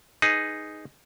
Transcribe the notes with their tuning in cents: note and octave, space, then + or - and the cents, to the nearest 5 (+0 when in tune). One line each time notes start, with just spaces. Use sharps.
D#4 +0 G#4 +0 B4 +0